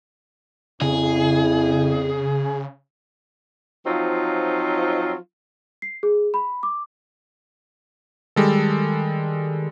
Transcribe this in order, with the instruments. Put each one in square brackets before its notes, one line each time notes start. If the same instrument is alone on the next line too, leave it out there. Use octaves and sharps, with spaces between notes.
[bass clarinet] F2 [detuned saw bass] C#3 [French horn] E4 [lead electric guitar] G#4
[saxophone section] F3 F#3 C4 D#4 F4
[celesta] C7
G#4
B5
D6
[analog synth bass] D#3 [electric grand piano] G3 G#3 A4